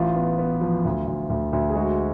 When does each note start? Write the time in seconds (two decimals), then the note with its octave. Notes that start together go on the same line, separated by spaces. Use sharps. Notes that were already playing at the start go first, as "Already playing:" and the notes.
Already playing: A1 F4
0.16 B3
0.39 B3
0.61 F3
0.85 D2
1.07 D2
1.30 D2
1.53 D2
1.69 G#4
1.75 G#3 F#4